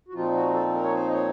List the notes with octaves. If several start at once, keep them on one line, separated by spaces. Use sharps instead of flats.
F#4
A#2 F3 C4 D#4 F4
F#4
A4
A4
A#4
C#5
C5
D#5
C#5